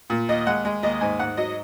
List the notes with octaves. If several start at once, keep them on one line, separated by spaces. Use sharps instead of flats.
A#2
D#2 D#5
G#3 F#5
G#3
D#2 D#5
G#2 G#5
G#2 F#5
F#3 D#5